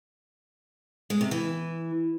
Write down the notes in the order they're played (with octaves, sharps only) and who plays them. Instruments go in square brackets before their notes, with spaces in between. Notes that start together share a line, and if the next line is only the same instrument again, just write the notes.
[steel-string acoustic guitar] G#3
C3
E3